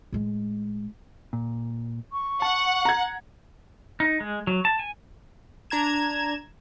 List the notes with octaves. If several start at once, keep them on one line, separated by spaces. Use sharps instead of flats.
A2 G#3
A#2
C#6
F#5 A5
A#5 G#6
D#4
G#3
F#3
A5
G#5
D4 A#5 G#6 E7